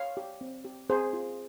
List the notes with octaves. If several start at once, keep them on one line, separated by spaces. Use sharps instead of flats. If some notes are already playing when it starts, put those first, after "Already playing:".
Already playing: C#5 F5
G4
C4
G4
C4 G#4 C5
F4